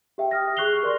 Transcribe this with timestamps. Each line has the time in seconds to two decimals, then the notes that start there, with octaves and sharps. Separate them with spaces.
0.18 G4 E5 G5
0.31 D#6 F6 A#6
0.57 G#4 C#6 F#6 C7 F7 G7
0.83 A#4 D5 C6